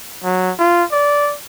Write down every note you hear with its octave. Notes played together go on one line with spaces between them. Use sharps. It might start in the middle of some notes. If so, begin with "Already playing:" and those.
F#3
F4
D5